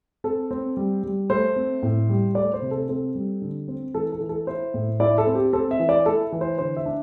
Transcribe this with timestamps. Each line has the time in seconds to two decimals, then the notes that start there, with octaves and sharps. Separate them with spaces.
0.24 C4 A4
0.51 C4
0.77 G3
1.03 G3
1.30 A3 C5
1.56 C4
1.83 A2
2.09 G3
2.35 A3 D5
2.54 C5
2.62 C3
2.71 A4
2.89 C4 A4
3.15 G3
3.42 D3
3.68 C4
3.94 E3 A4
4.12 A4
4.21 E3
4.29 A4
4.47 E4 C5
4.74 A2
5.00 E4 D5
5.18 A4
5.27 C4
5.35 G4
5.53 C4 A4
5.71 E5
5.79 E3
5.89 D5
6.06 E4 A4
6.32 E3
6.41 C5
6.58 D3 C5
6.77 E5
6.86 D4